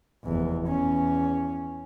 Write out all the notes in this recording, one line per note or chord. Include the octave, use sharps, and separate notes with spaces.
F1 E2
E2 C#4